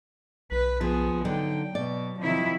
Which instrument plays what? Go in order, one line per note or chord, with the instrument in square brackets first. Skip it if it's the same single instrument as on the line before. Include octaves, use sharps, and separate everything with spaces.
[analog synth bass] B1 [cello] B4
[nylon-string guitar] F3 [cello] B3 G#4
[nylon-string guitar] D3 D4 D#4 [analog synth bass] F#3 [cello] G5
[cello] B2 [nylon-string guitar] D5
[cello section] C3 E4 [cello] D#3 F3